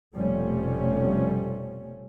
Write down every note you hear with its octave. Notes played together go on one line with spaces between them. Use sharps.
F1 B2 F3 G3 A3 C#4